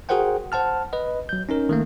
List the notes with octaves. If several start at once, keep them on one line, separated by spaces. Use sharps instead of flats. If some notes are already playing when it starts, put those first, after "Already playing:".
F#4 G#4 A#4 C5 F#5 G5
C5 F#5 A5 F6
B4 D#5
F#3 G6
C#4 D#4 A#4
D#3 A3 A#3